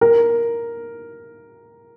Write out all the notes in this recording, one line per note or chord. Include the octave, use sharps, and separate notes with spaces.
A#4